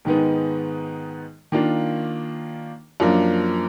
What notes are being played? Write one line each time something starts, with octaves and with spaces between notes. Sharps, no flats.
G#2 D#3 G#3 B3 D#4
D#3 A#3 D4 F4
F#2 F3 A#3 D4